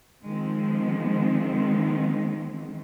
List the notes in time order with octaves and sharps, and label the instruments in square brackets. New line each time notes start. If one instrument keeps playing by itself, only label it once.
[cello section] D#3 F3 G#3 C4